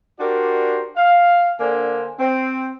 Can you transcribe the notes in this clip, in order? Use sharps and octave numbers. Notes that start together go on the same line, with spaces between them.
D4 F#4 G4 A#4 C5 D5
F5
D3 A#3 D4 C5 G#5
C4